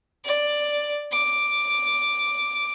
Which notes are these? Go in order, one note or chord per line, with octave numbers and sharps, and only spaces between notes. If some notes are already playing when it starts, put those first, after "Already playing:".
D5
D6